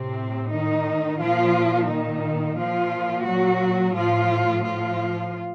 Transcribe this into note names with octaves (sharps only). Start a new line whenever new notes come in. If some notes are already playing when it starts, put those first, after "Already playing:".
Already playing: A2 C3 C4
D#3 D#4
A#2 F3 F4
D#3 D#4
A#2 F3 F4
F#3 F#4
A2 F3 F4
F3 F4